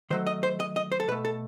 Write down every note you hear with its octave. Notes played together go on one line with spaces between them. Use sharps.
D#3 F#3 A3 C5
D#5
C5
D#5
D#5
C5
A4
B2 A3 B4
A4